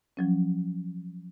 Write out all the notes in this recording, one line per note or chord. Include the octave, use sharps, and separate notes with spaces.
F3 F#3 C#4